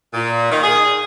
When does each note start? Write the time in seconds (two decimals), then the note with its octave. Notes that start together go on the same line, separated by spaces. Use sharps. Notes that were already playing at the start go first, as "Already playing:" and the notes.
0.14 A#2
0.51 D#3
0.63 G#4